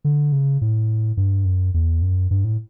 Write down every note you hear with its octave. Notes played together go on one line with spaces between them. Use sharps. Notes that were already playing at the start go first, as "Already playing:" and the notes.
D3
C#3
A2
G2
F#2
E2
F#2
G2
A2